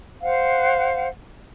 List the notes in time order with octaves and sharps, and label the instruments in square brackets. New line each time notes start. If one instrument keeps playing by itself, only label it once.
[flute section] C5 F5 F#5